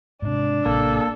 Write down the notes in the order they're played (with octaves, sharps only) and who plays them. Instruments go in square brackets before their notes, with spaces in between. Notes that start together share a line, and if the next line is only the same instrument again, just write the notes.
[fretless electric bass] G#2 C3 [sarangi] D4
[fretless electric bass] A1 C3 [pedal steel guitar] A#3 [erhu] A4